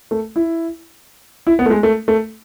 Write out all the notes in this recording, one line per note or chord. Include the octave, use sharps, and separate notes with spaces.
A3
E4
E4
B3
A3
G#3
A3
A3